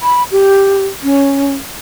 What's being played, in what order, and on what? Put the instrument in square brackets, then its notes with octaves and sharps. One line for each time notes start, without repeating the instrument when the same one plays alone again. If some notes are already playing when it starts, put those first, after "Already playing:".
[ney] B5
G4
C#4